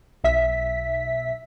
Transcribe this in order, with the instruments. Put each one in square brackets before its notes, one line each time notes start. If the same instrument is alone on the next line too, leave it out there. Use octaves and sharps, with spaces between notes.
[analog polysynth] B1 E5 B6